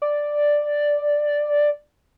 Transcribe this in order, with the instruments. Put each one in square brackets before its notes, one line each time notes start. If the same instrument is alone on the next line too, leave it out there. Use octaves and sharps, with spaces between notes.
[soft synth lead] D5